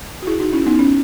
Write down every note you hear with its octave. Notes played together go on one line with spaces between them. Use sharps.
F#4
E4 G#4
D#4 F#4
C#4 E4
B3 D#4
C#4